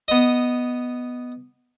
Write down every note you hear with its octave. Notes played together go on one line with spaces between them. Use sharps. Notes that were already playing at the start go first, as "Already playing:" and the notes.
B3 D#5